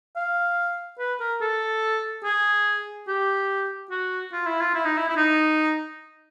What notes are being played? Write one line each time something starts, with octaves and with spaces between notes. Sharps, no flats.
F5
B4
A#4
A4
G#4
G4
F#4
F4
E4
F4
E4
D#4
E4
E4
D#4